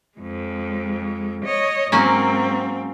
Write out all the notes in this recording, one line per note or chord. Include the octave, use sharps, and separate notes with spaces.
F2 G#3
C#5 D#5
G#2 F#3 A#3 C4 C#4